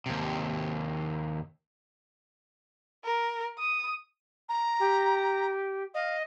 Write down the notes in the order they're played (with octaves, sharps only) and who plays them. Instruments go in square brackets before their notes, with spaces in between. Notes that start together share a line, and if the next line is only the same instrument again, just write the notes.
[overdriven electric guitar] D#2 C3
[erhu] A#4
D#6
[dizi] A#5
[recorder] G4
[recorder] D#5 [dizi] F5